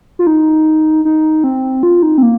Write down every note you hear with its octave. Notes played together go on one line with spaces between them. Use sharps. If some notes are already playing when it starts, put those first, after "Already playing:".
F4
D#4
D#4
C4
F4
D#4
C4
A#3